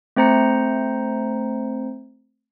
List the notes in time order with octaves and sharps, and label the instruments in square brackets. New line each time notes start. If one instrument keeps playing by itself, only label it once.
[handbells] A3 C4 C5 A#5 C#7